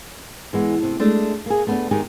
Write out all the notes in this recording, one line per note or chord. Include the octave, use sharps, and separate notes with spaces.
E3 G#3 B3
C3 A3
G#3 A3 D4
A#3 G#4
A3 B3 D4
D#3 G#3 D#4 G4 G#4